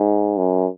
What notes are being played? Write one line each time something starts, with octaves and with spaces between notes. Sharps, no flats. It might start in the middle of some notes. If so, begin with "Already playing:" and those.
Already playing: G#2
F#2